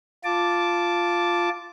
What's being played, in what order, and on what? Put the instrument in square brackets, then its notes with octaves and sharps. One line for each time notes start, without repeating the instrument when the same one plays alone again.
[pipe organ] F4 A5 D6